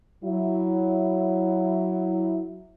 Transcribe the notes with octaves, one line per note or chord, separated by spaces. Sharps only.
F#3 E4